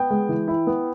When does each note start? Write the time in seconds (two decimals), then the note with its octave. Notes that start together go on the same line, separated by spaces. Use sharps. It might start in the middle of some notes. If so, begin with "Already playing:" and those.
Already playing: B3 G5
0.11 G#3
0.29 E3
0.48 E4
0.67 B3